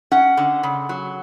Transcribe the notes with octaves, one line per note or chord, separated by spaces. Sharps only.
C#4 F#5
D3
C#3
F#3